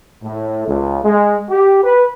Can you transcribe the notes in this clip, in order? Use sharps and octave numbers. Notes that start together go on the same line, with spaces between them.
A2
C#2
G#3
G4
B4